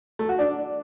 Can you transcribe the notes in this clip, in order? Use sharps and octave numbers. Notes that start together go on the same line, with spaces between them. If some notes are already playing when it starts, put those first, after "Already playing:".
A3
F#4
D4